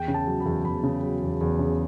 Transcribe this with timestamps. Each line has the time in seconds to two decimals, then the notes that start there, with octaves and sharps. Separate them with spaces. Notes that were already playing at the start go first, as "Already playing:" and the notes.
Already playing: E2 G5
0.08 C#3
0.14 A5
0.27 F#3
0.40 B5
0.45 E2
0.65 E2 B5
0.83 C#3
1.03 F#3
1.21 E2
1.41 E2
1.59 C#3